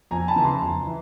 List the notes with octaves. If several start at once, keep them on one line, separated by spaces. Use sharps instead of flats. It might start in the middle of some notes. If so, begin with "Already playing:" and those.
F2 G#5 A#5
A5 B5
C#3 E3
A#5 C6
F2
E3